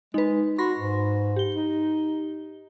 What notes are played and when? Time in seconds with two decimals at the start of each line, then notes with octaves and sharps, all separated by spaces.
0.14 G#3 D#4 B4
0.58 F#4 B5 C6 A#6
0.79 G#2
1.36 G4 G7
1.55 D#4